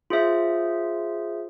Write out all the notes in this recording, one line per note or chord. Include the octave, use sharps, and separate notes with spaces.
F4 G#4 C5 E5